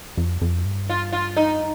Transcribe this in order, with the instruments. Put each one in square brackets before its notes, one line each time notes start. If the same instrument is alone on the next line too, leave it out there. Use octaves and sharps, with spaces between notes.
[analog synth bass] F2
F2
G2
[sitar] F4
F4
D#4